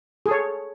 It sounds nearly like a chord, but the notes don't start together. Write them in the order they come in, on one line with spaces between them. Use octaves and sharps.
G#4 A4 C#5